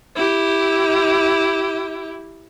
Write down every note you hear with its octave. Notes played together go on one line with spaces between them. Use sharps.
E4 G4